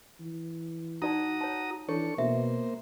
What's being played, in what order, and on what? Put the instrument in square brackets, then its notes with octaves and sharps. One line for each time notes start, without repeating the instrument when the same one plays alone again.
[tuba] E3
[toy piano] D#4 D5 A5 [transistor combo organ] F#4 A#5 D#6
[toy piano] C#5 A5
[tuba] E3 [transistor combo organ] D4 A4 C#6 [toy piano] C#5
[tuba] B2 [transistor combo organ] A#3 C5 [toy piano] E5